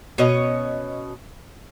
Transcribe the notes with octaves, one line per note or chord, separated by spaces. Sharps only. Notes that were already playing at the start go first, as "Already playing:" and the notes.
B2 C#4 C#5 D#5